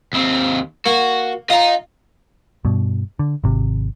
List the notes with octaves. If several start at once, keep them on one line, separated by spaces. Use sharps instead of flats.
D#2 C4
A#3 F#4
F4 D#5 A#5
G2 B2
D3
G#1 C3